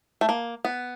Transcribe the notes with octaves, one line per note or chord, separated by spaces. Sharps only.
A3
A#3
B3